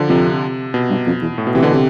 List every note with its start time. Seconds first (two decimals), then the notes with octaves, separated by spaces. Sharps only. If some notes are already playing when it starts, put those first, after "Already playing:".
Already playing: D3 F3
0.09 F2 C3
0.74 B2
0.90 G2
1.06 F2
1.22 E2
1.38 A2
1.47 B2
1.55 C3 E3
1.63 B2 D3
1.74 C3